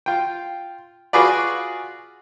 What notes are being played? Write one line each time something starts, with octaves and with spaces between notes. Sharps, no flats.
F4 G5
F4 F#4 G#4 B4 D5